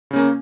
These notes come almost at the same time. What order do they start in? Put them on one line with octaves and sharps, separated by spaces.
C#3 C#4 A#3